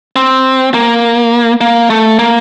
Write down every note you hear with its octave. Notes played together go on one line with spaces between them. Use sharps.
C4
A#3
A#3
A3
A#3